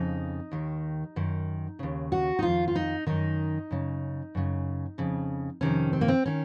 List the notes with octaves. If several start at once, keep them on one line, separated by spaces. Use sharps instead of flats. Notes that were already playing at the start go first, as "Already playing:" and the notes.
Already playing: F2 C#3 D#4
D#2 D#3
F#2 D#3
D#2 C#3
F#4
D#4
F2 D#3 F4
F4
D#4
F#2 D#3 D#4
F#2 C#3
F#2 C#3
F2 C#3
F2 C3 D#3 C#4
C4
A#3
C4
D#3 C#4